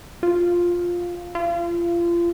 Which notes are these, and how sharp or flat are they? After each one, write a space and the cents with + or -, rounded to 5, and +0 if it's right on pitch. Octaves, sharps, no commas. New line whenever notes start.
F4 +5
F4 -30